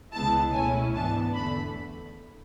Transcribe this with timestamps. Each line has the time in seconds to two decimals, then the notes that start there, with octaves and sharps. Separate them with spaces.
0.13 C#2 C#3 G#3 B3 E4 A5
0.53 B2 A3 C#4 E4 G#5
0.94 G#2 E3 B3 D4 A5
1.34 E2 D3 A3 B5